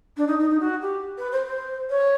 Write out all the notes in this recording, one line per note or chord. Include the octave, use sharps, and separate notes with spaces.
D4
D#4
D#4
D#4
F#4
G4
B4
C5
C5
C#5